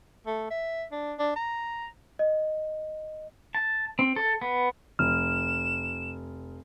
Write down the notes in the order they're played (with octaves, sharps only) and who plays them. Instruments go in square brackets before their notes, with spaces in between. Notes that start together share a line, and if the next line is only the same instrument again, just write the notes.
[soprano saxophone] A3
E5
D4
D4
A#5
[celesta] D#5
[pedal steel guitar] A5
C4
A4
B3
[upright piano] F1 [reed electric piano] F6 [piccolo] E7